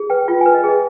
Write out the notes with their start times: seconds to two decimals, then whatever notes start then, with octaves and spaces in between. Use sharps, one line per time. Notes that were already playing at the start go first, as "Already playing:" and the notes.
Already playing: G#4
0.10 B4 G5
0.28 F4 G5
0.41 B4 G#5
0.54 D#5
0.64 G#4
0.69 D#5